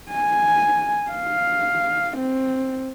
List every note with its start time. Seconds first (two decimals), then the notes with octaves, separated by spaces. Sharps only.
0.12 G#5
1.11 F5
2.17 C4